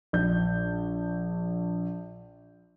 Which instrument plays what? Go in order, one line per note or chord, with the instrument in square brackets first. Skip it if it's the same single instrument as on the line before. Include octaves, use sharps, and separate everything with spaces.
[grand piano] A#1 G6